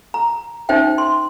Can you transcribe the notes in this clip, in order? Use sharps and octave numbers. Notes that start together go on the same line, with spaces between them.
A#5
C#4 D#4 C5 E5 G5
C6